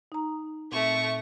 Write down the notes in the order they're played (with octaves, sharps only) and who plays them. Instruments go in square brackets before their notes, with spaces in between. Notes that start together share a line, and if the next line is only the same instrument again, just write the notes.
[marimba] D#4 A#5
[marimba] A#2 C4 [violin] A3 C#6